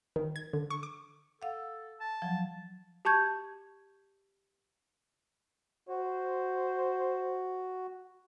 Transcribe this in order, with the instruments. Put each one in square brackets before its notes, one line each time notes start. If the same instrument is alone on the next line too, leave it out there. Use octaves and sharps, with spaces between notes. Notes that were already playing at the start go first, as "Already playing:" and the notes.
[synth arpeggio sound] D#3
G#6
D3
C#6
D6
[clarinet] A4 [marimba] F5 F#5
[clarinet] A5
[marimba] F3 F#3
[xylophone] G4 A5 C#6 G6 G#6
[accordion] F#4 [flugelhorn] C5